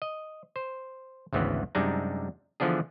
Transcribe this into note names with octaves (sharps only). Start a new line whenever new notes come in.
D#5
C5
G#1 D2 C#3 E3 B3
F#2 C3 G3 G#3 D4 D#4
D3 E3 F3 B3 D4 G#4